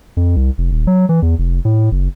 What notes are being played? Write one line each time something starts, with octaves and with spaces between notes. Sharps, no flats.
F2
C2
F1
D#1
F#3
E3
E2
F1
A2
F#1